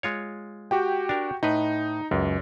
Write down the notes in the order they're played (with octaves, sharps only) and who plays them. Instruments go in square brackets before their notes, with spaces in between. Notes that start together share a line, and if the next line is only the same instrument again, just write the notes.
[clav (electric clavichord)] G#3 F4 C#5
[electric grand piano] F#4 G4 G5
[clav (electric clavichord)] D4 A#4
[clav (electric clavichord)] A2 B4 [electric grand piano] D#4
[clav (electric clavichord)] C#2 [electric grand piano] F#2